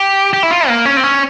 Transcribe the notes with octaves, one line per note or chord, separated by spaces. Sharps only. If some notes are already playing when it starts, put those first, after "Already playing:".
Already playing: G4
G4
E4
F4
A#3
C#4
C4
C#4